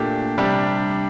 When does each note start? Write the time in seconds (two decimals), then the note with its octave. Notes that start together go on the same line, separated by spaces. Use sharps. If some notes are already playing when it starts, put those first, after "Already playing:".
Already playing: A#2 A3 D4 G4
0.38 C3 G3 D4 G4